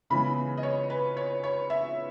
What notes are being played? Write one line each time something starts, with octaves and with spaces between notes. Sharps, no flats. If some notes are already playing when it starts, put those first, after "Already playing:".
C#3 E3 G#3 B3 B5
D#5
C#5
B4
C#5
C#5
E5